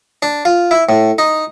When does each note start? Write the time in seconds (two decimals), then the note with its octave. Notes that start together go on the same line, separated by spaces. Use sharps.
0.22 D4
0.45 F4
0.71 E4
0.89 A2
1.18 D#4